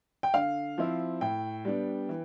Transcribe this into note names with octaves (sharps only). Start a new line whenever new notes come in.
G5
D3 F5
F3 C4 E4
A2 G5
G3 B3 D4
E3